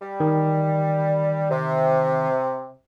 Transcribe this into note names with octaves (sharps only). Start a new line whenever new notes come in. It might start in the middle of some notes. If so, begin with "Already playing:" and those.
G3
D#3
C3